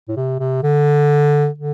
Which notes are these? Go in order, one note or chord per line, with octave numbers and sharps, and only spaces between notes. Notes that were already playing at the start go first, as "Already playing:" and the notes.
A2
C3
C3
D3
D3